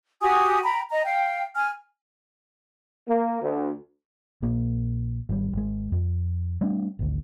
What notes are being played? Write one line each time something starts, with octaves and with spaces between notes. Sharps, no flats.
F#4 G4 G#5 D#6
G5 A#5 B5
D#5 A#5
F5 G5
G#5 F6
A#3
D2
A#1 A#3
G#1 G3
G#1 G#3
F2
G3 A3 C4 D4
G#1 D2